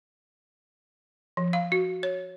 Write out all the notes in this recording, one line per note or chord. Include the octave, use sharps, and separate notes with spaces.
F3
F5
F#4
C#5